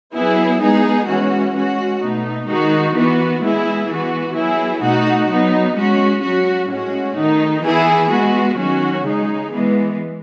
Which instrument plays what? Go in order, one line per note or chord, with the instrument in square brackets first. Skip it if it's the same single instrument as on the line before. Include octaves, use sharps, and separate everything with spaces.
[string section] F#3 B3 E4 G#4
G#3 B3 D#4 G#4
E3 G#3 C#4 F#4
G#3 C#4 F#4
B2 A3 D#4
D#3 G#3 D#4 F#4
E3 B3 F#4
G#3 B3 E4 G#4
E3 B3 F#4
F#3 B3 E4 G#4
B2 A3 D#4 F#4
F#3 B3 D#4
G#3 C#4 F#4
F#3 C#4 F#4
A2 G#3 C#4 F#4
D#3 A3 D#4
E3 B3 E4 G#4
G#3 B3 F#4
D#3 F#3 C#4 F#4
C#3 G#3 D#4 G#4
E3 G#3 B3